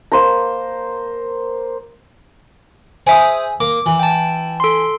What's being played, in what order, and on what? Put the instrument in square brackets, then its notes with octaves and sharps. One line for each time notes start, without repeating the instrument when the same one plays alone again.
[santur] A#3 C5 A#5
[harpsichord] G#4 [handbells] C5 E5 D#6
[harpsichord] A#3 [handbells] D6
[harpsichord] E3
[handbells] G5 A5
A4 C6